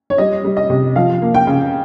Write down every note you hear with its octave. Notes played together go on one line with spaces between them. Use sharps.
C#5
G3 D#5
G3
D#5
C3
F3 F5
A#3
G5
C#3